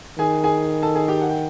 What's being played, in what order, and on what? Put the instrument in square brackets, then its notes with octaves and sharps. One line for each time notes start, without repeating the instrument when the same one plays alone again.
[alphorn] D#3 [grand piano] G#4 G#5
[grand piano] G#4 G#5
A4 A5
G#4 G#5
G4 G5
F#5
G5